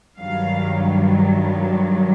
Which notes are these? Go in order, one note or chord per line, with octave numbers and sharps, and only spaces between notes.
G2 D#3 F#3 F5